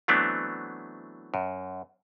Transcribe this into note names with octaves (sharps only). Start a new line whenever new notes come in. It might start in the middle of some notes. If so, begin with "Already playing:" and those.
E3 F#3 A3 B3 C4 D4
F#2